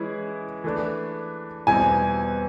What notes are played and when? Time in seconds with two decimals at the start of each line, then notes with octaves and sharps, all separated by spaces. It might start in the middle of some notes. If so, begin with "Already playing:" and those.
Already playing: E3 G#3 C#4 E4 G#4
0.64 E3 A3 D4
1.67 E2 B2 G3 C4 E4 G#5